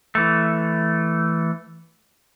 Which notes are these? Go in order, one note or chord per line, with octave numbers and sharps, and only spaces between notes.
E3 A3